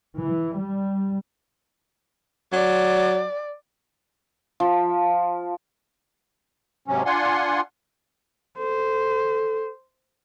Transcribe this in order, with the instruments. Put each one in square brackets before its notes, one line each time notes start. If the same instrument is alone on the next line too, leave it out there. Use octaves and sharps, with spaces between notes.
[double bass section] E3
G3
[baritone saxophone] F#3 [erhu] D5
[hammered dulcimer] F3
[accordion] G#2 C3 F#3 C#4
D4 F4 F#5 G#5 C6
[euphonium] A4 [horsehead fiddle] C5